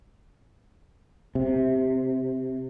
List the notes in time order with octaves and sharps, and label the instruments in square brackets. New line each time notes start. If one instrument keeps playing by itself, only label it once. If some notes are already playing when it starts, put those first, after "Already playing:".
[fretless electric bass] C3